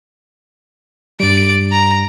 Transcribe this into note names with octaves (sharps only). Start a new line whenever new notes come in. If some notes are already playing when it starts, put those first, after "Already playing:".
G2 G3 D5 D7
A#5